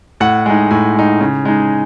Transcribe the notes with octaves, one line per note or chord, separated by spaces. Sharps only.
A2 F#5
G#3 D#4
A2 G#5
G#3 D#4
C#3
G#3 D#4